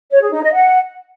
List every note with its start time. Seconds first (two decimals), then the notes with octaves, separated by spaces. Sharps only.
0.11 C#5
0.21 G#4
0.32 D#4
0.42 D#5
0.53 F#5